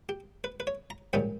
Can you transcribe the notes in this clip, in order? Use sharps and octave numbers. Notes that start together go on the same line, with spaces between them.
G4
B4
B4
C#5
A#5
A#1 G#2 D#3 G3 C#4 B5